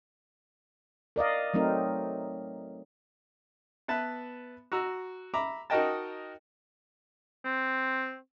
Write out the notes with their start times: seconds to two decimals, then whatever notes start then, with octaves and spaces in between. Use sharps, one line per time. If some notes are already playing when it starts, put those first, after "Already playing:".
1.16 A#4 D5 D#5 F5
1.54 F#3 A3 C4 D#4 A#4
3.88 B3 B4 E5 A5
4.72 F#4 A#5 E6
5.34 E5 A#5 B5 D6
5.70 D#4 F#4 A#4 D#5 G5 A5
7.45 C4